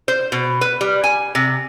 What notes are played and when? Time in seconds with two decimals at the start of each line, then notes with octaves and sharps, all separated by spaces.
0.08 C5
0.32 B2
0.61 B4
0.81 G3
1.04 G#5
1.35 C3